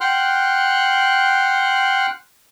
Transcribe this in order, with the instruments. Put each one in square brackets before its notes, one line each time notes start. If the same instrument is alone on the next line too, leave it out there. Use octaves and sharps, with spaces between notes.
[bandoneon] F#5 G5 C6 F6 F#6